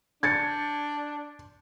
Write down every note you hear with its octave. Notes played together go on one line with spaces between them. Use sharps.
D4 G#6 A6 C#7